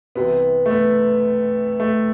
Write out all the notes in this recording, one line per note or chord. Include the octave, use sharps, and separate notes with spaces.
C2 C3 E3 B3
A3
B3
A3